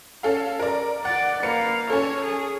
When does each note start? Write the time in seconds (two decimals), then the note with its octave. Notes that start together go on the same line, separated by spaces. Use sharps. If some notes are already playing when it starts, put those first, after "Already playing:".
0.23 C#4 A4 F5
0.59 A#4 D5
1.05 D5 F#5
1.43 A#3 B4 F5 C#7
1.90 C#4 A4 C#5
2.24 G#4